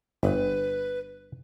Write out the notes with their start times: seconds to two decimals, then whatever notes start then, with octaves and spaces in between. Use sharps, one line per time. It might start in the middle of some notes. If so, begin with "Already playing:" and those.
0.23 G1 B4